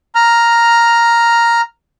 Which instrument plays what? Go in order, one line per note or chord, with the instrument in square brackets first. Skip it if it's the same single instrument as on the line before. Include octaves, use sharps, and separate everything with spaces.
[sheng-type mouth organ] A#5 F6